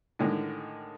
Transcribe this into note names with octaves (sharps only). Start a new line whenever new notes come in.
A2 D3 D#3 G#3